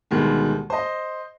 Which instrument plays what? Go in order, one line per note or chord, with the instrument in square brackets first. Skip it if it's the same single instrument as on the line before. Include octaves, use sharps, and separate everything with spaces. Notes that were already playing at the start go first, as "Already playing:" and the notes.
[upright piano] D2 B2 D#3 G3 G#3
C5 D#5